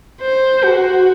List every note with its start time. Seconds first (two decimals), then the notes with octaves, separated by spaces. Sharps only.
0.21 C5
0.64 F#4